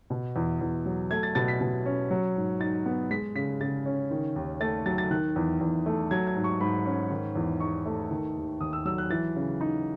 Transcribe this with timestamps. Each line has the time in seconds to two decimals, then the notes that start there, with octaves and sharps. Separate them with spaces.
0.10 B2
0.36 E2
0.61 E2
0.86 F#3
1.11 A3 G#6
1.23 A6
1.35 B2 A6
1.48 B6
1.61 B2
1.86 C#4
2.11 F#3
2.36 G#2
2.60 D#4 A6
2.86 B3
3.11 G#3 B6
3.35 C#3 B6
3.61 C#3 A6
3.86 C#4
4.11 D#3
4.36 D#2
4.60 A3 A6
4.86 F#3 A6
4.98 A6
5.11 D#3 F#6
5.36 E2
5.61 E2
5.86 A3
6.11 F#3 G#6
6.27 G#6
6.36 G#2
6.44 C#6
6.61 G#2 B5
6.86 C#4
7.10 D#3
7.36 E2
7.60 D#4 C#6
7.86 A3
8.11 D#3
8.36 D#2
8.61 D#2 D#6
8.73 E6
8.85 F#3 E6
8.98 F#6
9.10 E3 A6
9.36 C#3
9.61 D#4